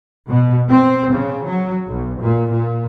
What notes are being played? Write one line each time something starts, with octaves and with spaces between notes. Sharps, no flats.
B2
C4
C#3
F#3
B1
A#2
A#2